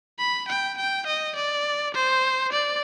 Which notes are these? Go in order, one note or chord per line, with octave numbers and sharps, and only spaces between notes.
B5
G5
G5
D#5
D5
C5
D5